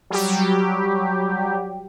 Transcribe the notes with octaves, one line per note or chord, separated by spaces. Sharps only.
F#3 G3 G4